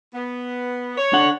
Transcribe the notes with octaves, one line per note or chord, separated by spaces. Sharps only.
B3
C#5
D4 A4 F#5